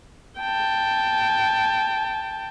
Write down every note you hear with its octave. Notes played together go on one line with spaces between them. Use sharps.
G5 A5